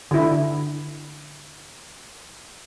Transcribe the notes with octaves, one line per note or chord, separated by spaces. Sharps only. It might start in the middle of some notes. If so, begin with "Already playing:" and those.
D3 E4